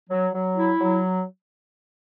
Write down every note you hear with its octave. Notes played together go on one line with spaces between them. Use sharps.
F#3
F#3
E4
F#3